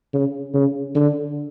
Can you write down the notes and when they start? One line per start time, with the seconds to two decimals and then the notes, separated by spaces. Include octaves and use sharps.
0.13 C#3
0.54 C#3
0.95 D3